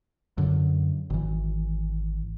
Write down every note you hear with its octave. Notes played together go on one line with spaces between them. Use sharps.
F#2 D3
G#1 E3